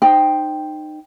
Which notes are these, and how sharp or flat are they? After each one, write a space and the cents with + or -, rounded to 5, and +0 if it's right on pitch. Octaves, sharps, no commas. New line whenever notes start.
D#4 -25 C5 +0 G5 +0